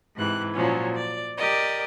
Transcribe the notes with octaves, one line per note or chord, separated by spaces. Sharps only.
G#2 C3 E3 F#6
A#2 F3 F#3 C#4
D5
G4 A#4 D5 D#5